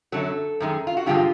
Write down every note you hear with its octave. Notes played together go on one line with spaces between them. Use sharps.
F#2 D3 F#3 A4
F#2 D#3 G#3
F4
F#4
G2 D3 F3 G#3 F4 G4